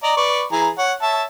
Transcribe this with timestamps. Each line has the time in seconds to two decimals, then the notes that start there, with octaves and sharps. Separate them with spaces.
0.03 D5 D#5 A#5
0.17 B4 D5 C#6
0.52 E3 G#4 A#5
0.78 C#5 F#5
1.02 C#5 E5 A5